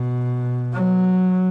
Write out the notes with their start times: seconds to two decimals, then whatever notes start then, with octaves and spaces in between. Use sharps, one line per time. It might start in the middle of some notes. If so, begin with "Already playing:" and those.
Already playing: B2
0.73 F#3